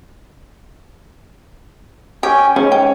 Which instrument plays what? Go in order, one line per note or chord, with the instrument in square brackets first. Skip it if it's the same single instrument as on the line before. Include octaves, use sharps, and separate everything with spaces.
[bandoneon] C#4 G5 G#5 [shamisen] G4
[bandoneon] G#2 [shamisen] C#3 [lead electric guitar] C#4
[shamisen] G5